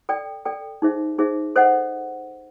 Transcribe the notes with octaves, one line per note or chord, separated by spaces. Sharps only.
A4 D5 G5
A4 D5 G5
D#4 G#4 C5 E5
D#4 G#4 C5 E5
A4 C5 D#5 F#5